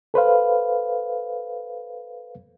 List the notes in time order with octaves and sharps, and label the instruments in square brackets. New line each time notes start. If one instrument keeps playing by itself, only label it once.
[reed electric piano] A4 B4 C5 F5